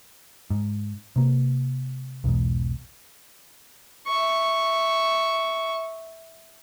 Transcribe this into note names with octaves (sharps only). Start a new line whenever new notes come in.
G#2
C3 A#3
B1 E2 G#2
E5 C#6